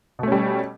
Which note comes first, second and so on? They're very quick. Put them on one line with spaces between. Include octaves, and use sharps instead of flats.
B2 A3 C#4 G3